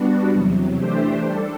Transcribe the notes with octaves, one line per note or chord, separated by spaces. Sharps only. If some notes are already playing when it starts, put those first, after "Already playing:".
Already playing: G3 B3 D4 F#4
E2 C3 F#3
E3 A3 D4 G4 C5
G3 D4 A4